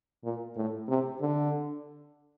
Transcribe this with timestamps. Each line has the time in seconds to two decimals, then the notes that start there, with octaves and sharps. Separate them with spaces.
0.24 A#2
0.56 A2
0.88 C3
1.21 D3